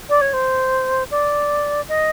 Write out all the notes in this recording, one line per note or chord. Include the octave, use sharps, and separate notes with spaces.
D5
C#5
C5
D5
D#5